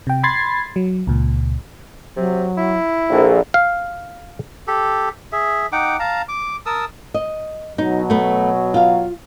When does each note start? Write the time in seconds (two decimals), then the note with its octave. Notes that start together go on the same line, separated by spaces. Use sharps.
0.07 C3 G5
0.23 B5 C6 G#6 A6 C7
0.76 F#3
1.07 C#2 A#2
2.17 C3 F#3
2.57 E4
3.10 A#1 A4
3.54 F5
4.68 G4 A4
5.32 G#4 E5
5.72 D#4 F#5 G5 D6
5.99 F5 A5 A#5
6.29 D6
6.66 A#4 A5 D#6 E6
7.14 D#5
7.78 B2 F#3 D#4
8.10 A3 B3
8.74 F4 F5